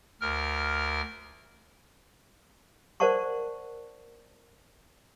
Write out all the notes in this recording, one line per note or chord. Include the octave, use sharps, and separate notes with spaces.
D2 A#4 F6
A#4 C5 D5 F#5 A5 C#6